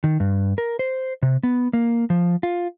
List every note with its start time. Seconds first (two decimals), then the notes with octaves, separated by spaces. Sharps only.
0.04 D#3
0.20 G2
0.58 A#4
0.79 C5
1.23 C3
1.43 B3
1.73 A#3
2.10 F3
2.43 F4